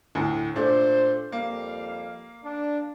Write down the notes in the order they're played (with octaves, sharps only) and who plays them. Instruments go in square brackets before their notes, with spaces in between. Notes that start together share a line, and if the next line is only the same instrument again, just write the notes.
[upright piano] D2 A2
[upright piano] A#2 A3 D4 [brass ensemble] C5
[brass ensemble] F2 G3 F5 [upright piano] A#3
[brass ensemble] D4